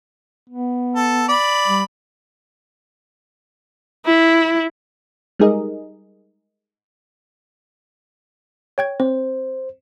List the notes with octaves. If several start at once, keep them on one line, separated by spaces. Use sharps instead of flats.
B3
A4
D5 B5
G3
E4
G3 G#3 D#4 G#4 A#4 D#5
C#5 G5 G#6
C4 C5